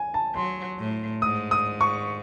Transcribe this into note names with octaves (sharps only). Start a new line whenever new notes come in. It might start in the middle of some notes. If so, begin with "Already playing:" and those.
Already playing: G#5
A5
F#3 C6
A2
G#2 D#6
D#6
C#6